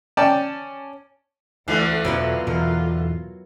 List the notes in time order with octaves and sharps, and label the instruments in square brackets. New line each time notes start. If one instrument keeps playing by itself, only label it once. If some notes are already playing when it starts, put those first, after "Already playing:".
[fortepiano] C#4 D5 G5 A5
[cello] D2 A3 [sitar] D3 E3 [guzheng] F5
[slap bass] E2 B2 [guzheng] F#3 B3 E4 [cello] F4
[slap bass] E2 G#2 B2 [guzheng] A#4